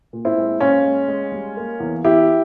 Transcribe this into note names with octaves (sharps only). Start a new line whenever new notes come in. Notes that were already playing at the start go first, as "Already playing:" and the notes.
A#2
C4 E4
G#3
A#2 C#4 F4
G#3
G#3
G3
A#3
E2
E2 E4 G4